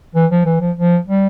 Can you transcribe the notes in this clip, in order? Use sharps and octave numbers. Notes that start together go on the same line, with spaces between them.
E3
F3
E3
F3
F3
G3